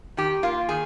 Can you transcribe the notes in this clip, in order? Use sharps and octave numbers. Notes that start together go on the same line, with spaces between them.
D#3 G4
A#3 F4
D#3 G#4